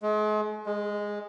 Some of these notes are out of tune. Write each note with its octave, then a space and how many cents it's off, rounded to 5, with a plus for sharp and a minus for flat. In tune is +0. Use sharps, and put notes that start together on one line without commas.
G#3 +40
G#3 -10